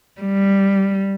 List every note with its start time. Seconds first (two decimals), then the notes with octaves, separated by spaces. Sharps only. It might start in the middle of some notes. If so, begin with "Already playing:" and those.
0.20 G3